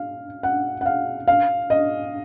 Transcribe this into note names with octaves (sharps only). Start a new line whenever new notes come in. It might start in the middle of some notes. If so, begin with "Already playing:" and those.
Already playing: F5
F#5
F#5
F5
F5
D#5